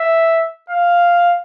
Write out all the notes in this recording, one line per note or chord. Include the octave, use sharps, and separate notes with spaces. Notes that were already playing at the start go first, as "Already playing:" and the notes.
Already playing: E5
F5